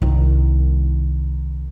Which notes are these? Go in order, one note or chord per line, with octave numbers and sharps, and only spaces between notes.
C2 D#3